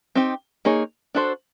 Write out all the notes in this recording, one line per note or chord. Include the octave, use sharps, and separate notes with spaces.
C4 D#4 G4
A#3 D#4 G#4 C#5
D4 F#4 A4 C5